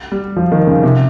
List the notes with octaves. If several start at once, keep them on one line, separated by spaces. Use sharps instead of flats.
G3
F3
D#3
C#3
C3